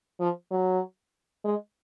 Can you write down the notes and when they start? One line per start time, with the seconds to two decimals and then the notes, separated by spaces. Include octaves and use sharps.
0.20 F3
0.51 F#3
1.44 G#3